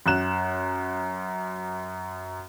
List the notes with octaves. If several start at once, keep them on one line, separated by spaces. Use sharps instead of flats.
F#2 F#6 E7